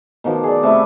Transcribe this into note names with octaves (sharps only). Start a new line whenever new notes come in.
B2 D#3 F3 D6
G#4 D5
C3 A3 E4